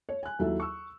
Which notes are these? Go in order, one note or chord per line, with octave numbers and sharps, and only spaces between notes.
C#5
G#5 F#6
D#2 F#3 E4 A4 E5
C#6 E6